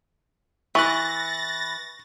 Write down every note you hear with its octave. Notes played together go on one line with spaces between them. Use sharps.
E3 B5 C#6 F#6 A6 A#6